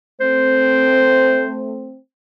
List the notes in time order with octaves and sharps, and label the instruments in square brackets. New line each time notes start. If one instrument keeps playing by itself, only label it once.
[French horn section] A3 C4 [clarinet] C5